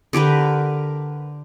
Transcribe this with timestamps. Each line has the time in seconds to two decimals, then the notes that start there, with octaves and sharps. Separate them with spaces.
0.13 D3 G4 A#4 B4